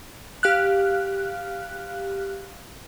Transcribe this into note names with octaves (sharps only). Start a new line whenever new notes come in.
G4 F5 F6 F#6